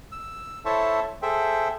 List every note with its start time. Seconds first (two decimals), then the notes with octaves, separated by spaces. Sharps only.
0.12 E6
0.65 E4 A4 C5 C#5 E5 A5
1.22 G#4 A4 C5 E5 G5